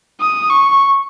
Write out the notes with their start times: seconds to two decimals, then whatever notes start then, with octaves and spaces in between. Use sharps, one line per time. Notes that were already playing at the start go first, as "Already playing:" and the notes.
0.21 D#6
0.50 C#6